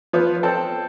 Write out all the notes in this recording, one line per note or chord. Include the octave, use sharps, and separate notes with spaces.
F3 B3
C4 A4